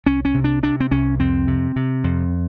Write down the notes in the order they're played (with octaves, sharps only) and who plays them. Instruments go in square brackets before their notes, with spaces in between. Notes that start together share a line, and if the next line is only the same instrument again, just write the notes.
[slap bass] C2 C#4
C#4
C3
D4
C3 D4
C4
C2 C#4
F2 C4
C3
C3
F2